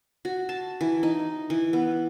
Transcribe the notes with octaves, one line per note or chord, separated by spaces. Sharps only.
F#4
A5
E3
D#4
E3
B3